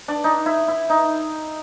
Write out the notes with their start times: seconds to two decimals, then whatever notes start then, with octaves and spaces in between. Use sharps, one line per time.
0.08 D4
0.24 D#4
0.46 E4
0.68 E4
0.90 D#4